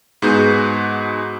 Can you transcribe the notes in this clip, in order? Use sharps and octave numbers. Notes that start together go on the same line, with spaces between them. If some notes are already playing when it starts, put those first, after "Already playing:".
G#2 B3 F#4 G#4 G6